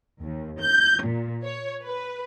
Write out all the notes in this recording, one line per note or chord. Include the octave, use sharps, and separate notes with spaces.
D#2
G6
A#2
C#5
B4